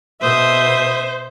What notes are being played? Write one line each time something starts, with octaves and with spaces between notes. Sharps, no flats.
B2 C5 E5 D#6